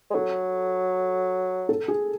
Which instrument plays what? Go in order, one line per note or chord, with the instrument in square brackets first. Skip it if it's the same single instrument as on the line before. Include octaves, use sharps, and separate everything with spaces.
[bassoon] G#3
[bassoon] F#3 [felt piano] A4
[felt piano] A4
G#4